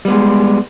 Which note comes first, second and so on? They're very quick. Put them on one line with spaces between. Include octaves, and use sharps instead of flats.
G3 B3 G#3